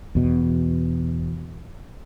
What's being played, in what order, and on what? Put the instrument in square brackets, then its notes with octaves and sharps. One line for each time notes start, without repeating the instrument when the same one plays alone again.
[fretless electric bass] E2 B2